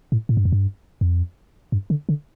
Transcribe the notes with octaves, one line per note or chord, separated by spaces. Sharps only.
A2
A2
G2
F2
G2
F2
G2
D3
D3